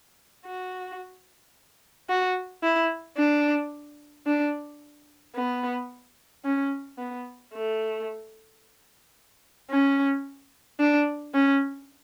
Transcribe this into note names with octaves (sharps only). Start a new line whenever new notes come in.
F#4
F#4
E4
D4
D4
B3
C#4
B3
A3
C#4
D4
C#4